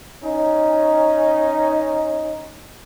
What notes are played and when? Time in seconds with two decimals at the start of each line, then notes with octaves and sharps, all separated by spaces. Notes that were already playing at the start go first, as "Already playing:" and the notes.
0.23 C#4 D#4